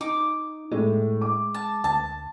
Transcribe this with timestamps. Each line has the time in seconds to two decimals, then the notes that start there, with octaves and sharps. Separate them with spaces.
0.01 D#4 D6
0.72 A2 G#3
1.21 D6
1.54 A5
1.84 D2 A5